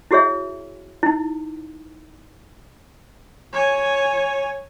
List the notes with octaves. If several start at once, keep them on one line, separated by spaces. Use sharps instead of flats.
E4 F#4 G#4 C#5 E5
D#4 E4
C#5 G#5